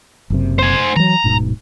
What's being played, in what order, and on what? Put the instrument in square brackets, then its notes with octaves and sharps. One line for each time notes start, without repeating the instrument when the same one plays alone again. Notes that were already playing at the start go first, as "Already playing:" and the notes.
[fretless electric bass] F#1 F#2 C3
[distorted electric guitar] C5 G#5
[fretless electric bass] E3 F#3 [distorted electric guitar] A#5
[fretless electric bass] D1 G#2 B2